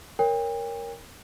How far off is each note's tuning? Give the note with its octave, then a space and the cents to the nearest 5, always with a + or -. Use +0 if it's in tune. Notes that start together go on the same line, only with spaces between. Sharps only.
A#4 +0 C#5 +0 G5 +40